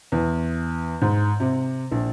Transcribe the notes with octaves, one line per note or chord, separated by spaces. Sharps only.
E2
G#2
C3
A#1